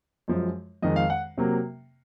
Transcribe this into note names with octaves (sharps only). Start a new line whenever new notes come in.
F#2 F3 G#3
F2 D#3 G#3 D#5
F5
F#5
C3 F#3 A#3